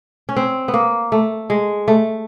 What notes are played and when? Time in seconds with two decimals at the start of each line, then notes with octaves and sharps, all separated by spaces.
0.29 C#4
0.37 C4
0.68 B3
0.74 A#3
1.12 A3
1.50 G#3
1.88 A3